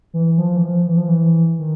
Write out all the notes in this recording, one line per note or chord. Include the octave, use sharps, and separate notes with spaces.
E3
F3
E3
F3
E3
F3
E3
D#3